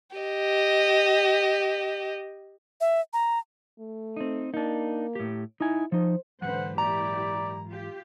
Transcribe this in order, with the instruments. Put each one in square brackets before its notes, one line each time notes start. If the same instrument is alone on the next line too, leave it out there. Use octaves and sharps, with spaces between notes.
[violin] G4 D#5
[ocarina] E5
A#5
[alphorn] A3
[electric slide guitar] C4 D#4
[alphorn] A#3 [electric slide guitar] D4 D#4
[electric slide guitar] A2 G4
[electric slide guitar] D#4 G#5 [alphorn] E4
[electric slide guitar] F3 D#4 [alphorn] C5
[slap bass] G#2 E3 F#3 [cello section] D3 B4 C5 [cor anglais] F#5
[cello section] A#2 E4 G4 [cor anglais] D5 [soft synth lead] A#5
[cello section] F4 G4